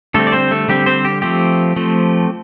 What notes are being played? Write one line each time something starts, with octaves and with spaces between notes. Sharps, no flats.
D3 G3 A3 C4 A4
D5
C4 C5
A3 A4
D3 G3 C4 G4
C4 C5
G4
F3 A3 C4 G4
F3 A3 C4